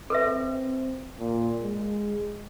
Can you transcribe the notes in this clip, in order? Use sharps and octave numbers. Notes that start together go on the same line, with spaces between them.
C4 A4 B4 E5
A#2
G#3